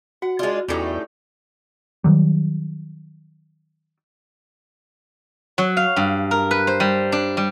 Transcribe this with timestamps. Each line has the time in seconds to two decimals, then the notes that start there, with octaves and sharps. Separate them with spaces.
0.22 F#4 F#5
0.39 G#3 D4 F4 G#4 D5
0.68 E2 A2 G3 A3 C#4 D#4 G4
2.04 D#3 F#3 G3
5.58 F#3
5.77 F5
5.96 G2
6.31 A#4
6.51 B4
6.67 C5
6.80 G3
7.12 D4
7.37 G3